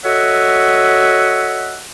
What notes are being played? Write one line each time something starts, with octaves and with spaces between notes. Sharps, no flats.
F#4 A4 C#5 D#5 E5 F#5